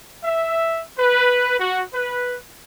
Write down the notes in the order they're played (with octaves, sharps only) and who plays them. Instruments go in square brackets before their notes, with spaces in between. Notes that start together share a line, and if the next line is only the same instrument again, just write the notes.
[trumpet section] E5
B4
F#4
B4